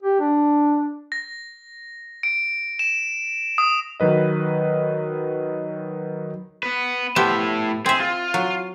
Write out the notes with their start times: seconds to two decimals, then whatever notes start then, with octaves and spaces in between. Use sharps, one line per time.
0.03 G4
0.20 D4
1.12 A#6
2.23 D7
2.79 E7
3.58 D#6
4.00 D#3 F#3 B4 D#5
6.63 B3 B4
7.16 A2 F3 B3 G4 E5
7.86 C4 G#4 E5
8.00 F4
8.34 F#3